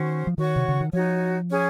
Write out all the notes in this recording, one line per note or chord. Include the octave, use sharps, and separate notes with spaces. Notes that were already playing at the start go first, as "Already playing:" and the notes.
Already playing: D#3 C#4 F#4 C5
F3
D#3 F#4 C#5 F#5 C#6
C3
C#3
D#3
F3 D#4 F#4 C#5
C#4 G#4 C#5